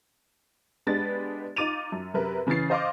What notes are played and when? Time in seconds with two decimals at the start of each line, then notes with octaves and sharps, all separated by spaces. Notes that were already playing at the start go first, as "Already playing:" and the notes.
0.87 G#3 B3 D4 G4 B4 A6
1.56 D#4 F4 D6 A6 D#7 F7
1.92 F#2
2.14 F#2 C3 A#4 B4 E5
2.47 C#3 E3 C#4 A6 C7
2.70 C5 D#5 F5 C6 D6